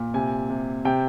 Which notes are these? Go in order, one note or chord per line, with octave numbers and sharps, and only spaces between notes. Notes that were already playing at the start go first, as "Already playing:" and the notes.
Already playing: A#2
C3 G#5
C3
C3 G5